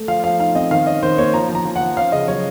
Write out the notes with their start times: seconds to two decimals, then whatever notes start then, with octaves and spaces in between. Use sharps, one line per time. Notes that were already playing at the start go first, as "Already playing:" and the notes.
Already playing: A3
0.08 F3 F5
0.24 F3 F5
0.39 D#4 F5
0.55 C4 D#5
0.71 D#3 F5
0.87 C#4 D#5
1.03 D#3 C5
1.18 A#3 C#5
1.34 F3 A#5
1.49 F3
1.55 A#5
1.65 F3
1.76 F#5
1.81 F3
1.97 C#4 F5
2.12 C#3 D#5
2.28 F#3 C#5